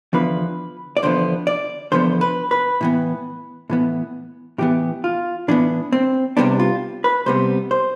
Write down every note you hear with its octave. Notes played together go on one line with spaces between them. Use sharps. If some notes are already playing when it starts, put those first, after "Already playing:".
E2 D3 F3 B3 B4
D5
E2 D3 F3 B3 C5
D5
E2 D3 F3 B3 C5
B4
B4
A2 E3 B3
A2 E3 B3
A2 E3 B3 G4
F4
A2 E3 B3 D4
C4
C2 C3 G3 B3 D4
F4
B4
C2 C3 G3 B3 C5
C5